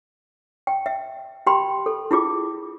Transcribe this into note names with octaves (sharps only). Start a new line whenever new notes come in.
G5
E5
G4 G5 B5 C6
A4
E4 F4 G#4 D6